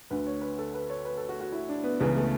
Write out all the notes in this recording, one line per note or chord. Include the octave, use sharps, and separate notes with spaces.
D2 D3 B4
C#5
B4
A4
B4
C#5
B4
A4
F#4
F#4
E4
D4
B3
C#2 C#3 E3 B3
A3